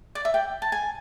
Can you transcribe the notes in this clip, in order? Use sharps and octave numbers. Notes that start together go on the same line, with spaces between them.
D5
E5
G5
A5
G#5